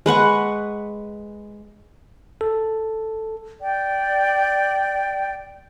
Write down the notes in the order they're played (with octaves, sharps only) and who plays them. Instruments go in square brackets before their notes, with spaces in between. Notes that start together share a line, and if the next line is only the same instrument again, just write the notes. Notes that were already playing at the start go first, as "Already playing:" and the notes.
[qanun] G#3 B4 F#5 C#6
[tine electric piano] A4
[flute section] D5 G5